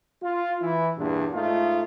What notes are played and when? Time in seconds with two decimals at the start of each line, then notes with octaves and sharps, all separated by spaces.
0.23 F4
0.62 E3 E4
0.97 E2 G2 A#2 D4
1.34 G#2 A3 D#4 F4